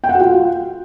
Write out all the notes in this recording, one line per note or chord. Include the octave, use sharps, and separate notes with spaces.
G5
F#5
F#4
F4